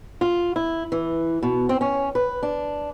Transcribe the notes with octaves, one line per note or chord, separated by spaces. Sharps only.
F4
E4
E3
B2
C4
C#4
B4
D4